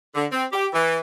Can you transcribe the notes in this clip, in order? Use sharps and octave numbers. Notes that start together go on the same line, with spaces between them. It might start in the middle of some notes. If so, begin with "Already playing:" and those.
D3
C4
G4
E3